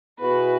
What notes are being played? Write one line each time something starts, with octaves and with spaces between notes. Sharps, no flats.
B2 B3 E4 F#4 G#4 B4